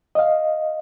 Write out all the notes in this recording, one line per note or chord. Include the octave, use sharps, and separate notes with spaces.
D#5 F5